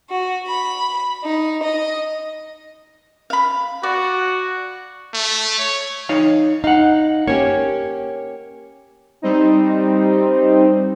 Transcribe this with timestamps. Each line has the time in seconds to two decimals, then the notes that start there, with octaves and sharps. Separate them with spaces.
0.11 F#4
0.47 B5
1.23 D#4
1.63 D#5
3.30 F5 B5
3.83 F#4 D5
5.13 A3
5.59 C#5
6.09 D#4 C#5 F5
6.64 D#4 F5 F#5
7.27 A#3 C#4 G4 C#5
9.22 G3 C4 D#4